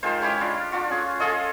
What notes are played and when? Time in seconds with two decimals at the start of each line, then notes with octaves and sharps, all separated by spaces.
0.03 D#3 G#3 F4 C5
0.20 G#3 C#4 E4 G4
0.41 D4 F4
0.72 D4 F4 F#4
0.90 C#4 G#4
1.20 F4 G#4 A4 D#5